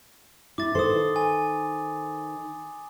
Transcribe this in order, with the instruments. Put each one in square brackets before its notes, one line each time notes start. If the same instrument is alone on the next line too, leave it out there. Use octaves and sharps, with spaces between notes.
[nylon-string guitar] E4 [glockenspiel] D6 A6
[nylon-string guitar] D#3 A4 C5 [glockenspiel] C6 D#6
[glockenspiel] G#5